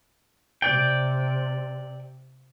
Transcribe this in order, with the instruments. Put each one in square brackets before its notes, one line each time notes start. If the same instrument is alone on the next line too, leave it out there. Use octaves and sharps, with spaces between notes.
[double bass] C3 [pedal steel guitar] D5 G5